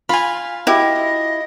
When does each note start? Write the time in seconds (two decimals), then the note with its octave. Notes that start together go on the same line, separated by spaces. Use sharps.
0.09 F4 G#5 B5
0.67 E4 F#4 G4 D#5 E5